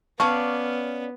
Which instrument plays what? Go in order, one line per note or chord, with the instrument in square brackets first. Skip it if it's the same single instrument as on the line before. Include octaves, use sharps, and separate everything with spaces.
[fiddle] B3 [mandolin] C#4 D5 F5 [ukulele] A5 [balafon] C#6